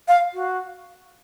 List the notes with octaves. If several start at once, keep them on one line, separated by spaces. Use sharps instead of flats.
F5
F#4